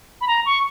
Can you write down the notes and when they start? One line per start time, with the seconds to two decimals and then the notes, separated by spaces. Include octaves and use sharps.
0.21 B5
0.28 A#5
0.46 C#6